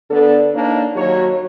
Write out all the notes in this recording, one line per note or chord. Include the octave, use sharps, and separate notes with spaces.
D3 B3 D4 A4
A#3 D4 D#4 C#5
D#2 F#3 F#4 C#5